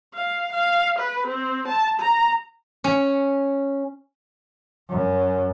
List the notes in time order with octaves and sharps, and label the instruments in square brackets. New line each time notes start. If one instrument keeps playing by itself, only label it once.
[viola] F5
F5
B4
C4
A5
A#5
[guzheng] C#4
[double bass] F#2